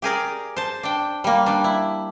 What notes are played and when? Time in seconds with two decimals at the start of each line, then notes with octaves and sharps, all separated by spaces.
0.02 G4 G#4 A#4 D5
0.56 C5 A5
0.83 D4 G5
1.24 G3 A#3
1.46 G3 D4
1.64 E4